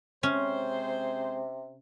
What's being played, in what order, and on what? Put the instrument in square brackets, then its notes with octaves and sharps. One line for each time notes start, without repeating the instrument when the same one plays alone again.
[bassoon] C3 [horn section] G#3 C4 C5 [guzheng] C#4